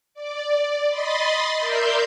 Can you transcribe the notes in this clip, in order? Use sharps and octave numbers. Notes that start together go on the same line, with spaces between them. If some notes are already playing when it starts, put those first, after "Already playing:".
D5
D#5 B5 C6 A6
A#4 D5 E5 C6 G6